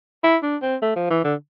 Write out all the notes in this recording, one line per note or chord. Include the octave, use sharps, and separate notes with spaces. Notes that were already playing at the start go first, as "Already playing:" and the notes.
E4
D4
C4
A3
F3
E3
D3